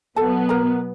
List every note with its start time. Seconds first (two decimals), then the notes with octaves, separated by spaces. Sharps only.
0.16 B2 F#3 B3 A4 A5
0.49 A#4 A#5